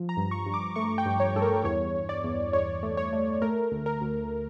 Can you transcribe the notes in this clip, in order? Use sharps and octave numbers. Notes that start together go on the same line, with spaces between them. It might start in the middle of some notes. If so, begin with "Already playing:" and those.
Already playing: F3
A#5
G2
C#6
G2
D6
A3 C#6
G5
G2
C#5
G2 A4
A#4
E2 C#5
E2
D5
E2
E2 C#5
A3
C#5
A3
A3 A#4
D2
A#4
D2